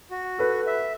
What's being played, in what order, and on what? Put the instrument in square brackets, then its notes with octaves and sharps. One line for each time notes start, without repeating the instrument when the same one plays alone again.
[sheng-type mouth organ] F#4
[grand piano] A4 B4
[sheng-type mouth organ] E5